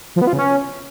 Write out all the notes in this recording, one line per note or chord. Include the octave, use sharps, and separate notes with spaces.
F3
B3
F4
C#3
C#4